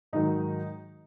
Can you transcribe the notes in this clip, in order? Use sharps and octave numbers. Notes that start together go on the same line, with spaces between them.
G#2 D#3 F#3 D#4